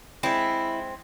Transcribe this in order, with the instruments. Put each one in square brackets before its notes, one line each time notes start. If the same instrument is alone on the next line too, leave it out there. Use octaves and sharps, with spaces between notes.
[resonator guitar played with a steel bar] G#3 C4 [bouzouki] E4